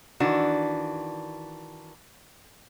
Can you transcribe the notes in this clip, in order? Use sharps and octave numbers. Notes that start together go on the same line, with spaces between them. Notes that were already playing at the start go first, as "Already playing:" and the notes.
D#3 E3 D4 F#4